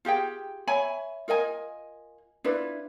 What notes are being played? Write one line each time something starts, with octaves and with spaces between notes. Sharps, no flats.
F4 G4 G#4 G5
C#5 E5 G#5 B5
F4 A#4 D#5 G#5
D4 E4 F4 B4